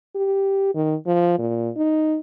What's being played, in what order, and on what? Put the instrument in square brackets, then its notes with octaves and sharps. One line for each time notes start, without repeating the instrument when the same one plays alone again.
[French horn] G4
D#3
F3
A#2
D#4